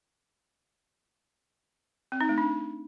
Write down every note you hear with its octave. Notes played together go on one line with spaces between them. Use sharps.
C4
D#4
A3
D4